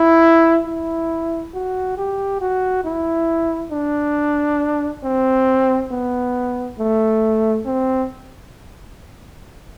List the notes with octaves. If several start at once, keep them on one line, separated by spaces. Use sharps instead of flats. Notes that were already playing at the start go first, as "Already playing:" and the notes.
Already playing: E4
E4
F#4
G4
F#4
E4
D4
C4
B3
A3
C4